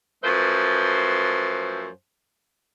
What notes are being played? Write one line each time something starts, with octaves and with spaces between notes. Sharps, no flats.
F#2 F3 A3 B4 C5